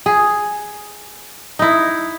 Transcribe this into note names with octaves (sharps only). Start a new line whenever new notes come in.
G#4
D#4 E4